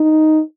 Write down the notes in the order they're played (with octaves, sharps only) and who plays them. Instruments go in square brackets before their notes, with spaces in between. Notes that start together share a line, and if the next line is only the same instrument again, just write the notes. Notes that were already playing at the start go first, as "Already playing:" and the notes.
Already playing: [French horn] D#4